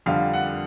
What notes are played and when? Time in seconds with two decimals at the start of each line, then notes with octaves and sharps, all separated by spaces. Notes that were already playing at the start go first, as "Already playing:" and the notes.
0.06 F2 D3 G3 F5
0.34 F#5